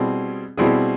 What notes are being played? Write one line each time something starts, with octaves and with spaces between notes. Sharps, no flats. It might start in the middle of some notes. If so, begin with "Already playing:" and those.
Already playing: B2 G3 C4 E4 G#4
B2 G3 C4 E4 G#4